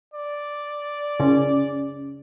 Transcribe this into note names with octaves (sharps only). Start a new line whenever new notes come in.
D5
C#3 C#4